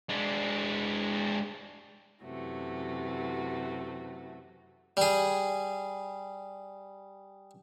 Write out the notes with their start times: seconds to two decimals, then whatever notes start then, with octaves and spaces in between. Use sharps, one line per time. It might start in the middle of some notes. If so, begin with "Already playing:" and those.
0.09 G#3 D4
2.23 F#2 C3 E3 A3 F#4
4.97 G3 G#4